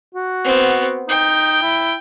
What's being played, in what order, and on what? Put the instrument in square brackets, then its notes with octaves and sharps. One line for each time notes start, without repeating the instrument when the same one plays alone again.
[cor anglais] F#4
[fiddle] B3 C4
[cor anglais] D#4 [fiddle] G5
[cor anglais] E4